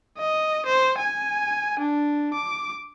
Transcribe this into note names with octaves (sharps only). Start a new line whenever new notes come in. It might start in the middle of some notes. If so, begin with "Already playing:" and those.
D#5
C5
G#5
D4
D6